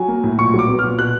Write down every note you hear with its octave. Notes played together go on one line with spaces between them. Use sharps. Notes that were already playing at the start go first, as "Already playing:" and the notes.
Already playing: F#3 G#5
A#3
A2
A#2 C#6
F#3
D6
B3
A#2 F6
B2 F#6